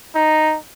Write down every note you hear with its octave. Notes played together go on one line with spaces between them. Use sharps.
D#4